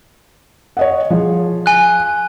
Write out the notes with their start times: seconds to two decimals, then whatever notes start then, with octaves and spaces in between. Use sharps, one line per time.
0.77 C#5 D#5 F#5
1.10 F3 G#4
1.66 G#5 F#6